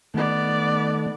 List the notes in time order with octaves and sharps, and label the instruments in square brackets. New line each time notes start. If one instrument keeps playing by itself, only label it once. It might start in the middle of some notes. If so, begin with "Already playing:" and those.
[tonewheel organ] D#3 A3 [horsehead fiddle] B3 D5